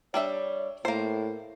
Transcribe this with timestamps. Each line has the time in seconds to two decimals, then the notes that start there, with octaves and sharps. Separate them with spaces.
0.14 G3 D4 C#5 E5
0.85 A2 A#3 C5